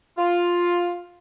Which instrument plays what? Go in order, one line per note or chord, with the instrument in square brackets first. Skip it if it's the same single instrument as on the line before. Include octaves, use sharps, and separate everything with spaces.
[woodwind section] F4